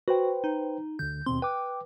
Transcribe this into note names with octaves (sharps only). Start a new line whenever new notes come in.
F#4 B4 C5 G5
D#4
D2 D3 G6
D#2 B2 C4 C6
B4 G5 D6